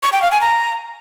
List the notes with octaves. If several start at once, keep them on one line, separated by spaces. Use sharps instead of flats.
C#6
G5
F5
G#5
A#5